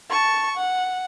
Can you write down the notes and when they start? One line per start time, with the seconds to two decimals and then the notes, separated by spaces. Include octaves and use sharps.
0.10 A5 C#6
0.57 F#5